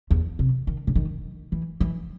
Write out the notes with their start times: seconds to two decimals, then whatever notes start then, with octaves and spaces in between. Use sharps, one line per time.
0.11 E2
0.39 C3
0.67 D#3
0.87 C#3
0.96 D#3
1.52 E3
1.81 E3